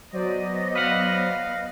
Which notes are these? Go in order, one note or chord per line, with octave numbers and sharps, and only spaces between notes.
F#3 B3 C5 D5 D#5
B4 F5 F#5